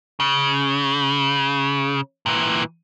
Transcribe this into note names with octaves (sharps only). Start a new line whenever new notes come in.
C#3
A#2 E3